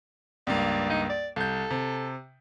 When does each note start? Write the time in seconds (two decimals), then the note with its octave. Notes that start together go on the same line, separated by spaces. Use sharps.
0.47 C#2 G2 A#3 D5
0.90 D#4
1.10 D5
1.36 C2 A4 G6
1.70 C3